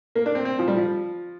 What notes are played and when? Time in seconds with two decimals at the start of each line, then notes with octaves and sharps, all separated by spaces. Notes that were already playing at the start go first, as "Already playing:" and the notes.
0.15 A#3
0.26 D4
0.35 C4
0.45 C4
0.59 F3
0.68 G3
0.76 F3